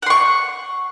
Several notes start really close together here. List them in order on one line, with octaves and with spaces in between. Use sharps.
F#5 C6 C#6